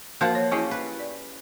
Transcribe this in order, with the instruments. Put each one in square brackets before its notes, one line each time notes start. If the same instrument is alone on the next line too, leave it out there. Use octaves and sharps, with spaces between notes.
[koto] F3 F4 F#5 [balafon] A#3 F#4 A#4
[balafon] C#5
[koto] C#4 G4 [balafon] E4 G#4 D#5
[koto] B4
[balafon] D5